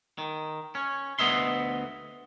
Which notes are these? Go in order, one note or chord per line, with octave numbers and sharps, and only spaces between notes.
D#3
C#4
D2 B3 D#5 E5 C6